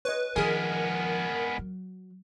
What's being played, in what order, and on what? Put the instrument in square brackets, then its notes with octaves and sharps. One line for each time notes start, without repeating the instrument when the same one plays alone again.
[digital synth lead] B4 [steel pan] C#5 D#5
[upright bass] D#3 F3 [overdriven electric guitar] G#3 B3 [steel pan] G#4 G#5 [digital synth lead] A#4
[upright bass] F#3